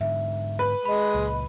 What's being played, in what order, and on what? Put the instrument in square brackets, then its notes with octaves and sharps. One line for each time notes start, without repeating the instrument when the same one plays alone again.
[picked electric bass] G#2 D3 [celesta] E5
[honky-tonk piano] B4
[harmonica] G#3 [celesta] D#5 B5
[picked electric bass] C#2 A#2